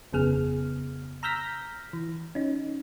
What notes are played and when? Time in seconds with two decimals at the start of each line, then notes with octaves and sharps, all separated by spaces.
0.13 G1 F2 C#3 B3 G#4 F6
1.23 A#5 E6 F6 G6 A#6 B6
1.93 E3
2.35 C#4 D#4